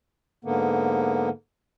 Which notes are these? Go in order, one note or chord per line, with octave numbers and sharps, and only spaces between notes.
G#2 D3 A#3 B3